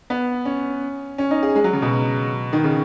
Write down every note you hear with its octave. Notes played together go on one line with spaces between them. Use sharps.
B3
C#4
C#4
D#4
G#4
G#3
F#3
C#3
B2
D#3
C#3